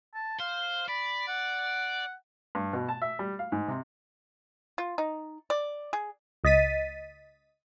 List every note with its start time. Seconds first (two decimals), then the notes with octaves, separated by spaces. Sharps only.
0.14 A5
0.40 C5 F5
0.89 D5 B5
1.28 F#5
2.55 G2
2.73 B2
2.89 A5
3.02 E5
3.19 G3
3.39 F5
3.52 G#2
3.68 C3
4.78 F4
4.98 D#4
5.50 D5
5.93 G#4
6.44 C#2 D#5 A6 B6 D#7